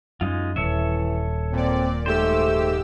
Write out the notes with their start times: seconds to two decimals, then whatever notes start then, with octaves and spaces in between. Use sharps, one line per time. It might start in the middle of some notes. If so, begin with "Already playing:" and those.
0.21 F#2 G#3 D#4 F4
0.56 D#1 E3 A4 C#5 E5
1.53 A#2 C4 D5
2.06 G#2 A3 G4 C5 E6